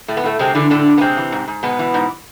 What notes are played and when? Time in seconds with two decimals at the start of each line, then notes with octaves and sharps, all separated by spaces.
0.08 A2 A3
0.17 B3
0.24 A2 A3
0.39 C3 G#3 C4
0.55 D3 E3 D4
0.70 A2 D3 D4
0.86 A2
0.98 B3
1.01 C3 G#3 C4
1.17 E3
1.32 G#2
1.48 G#2
1.63 B2 G#3 B3
1.79 E3
1.94 G#2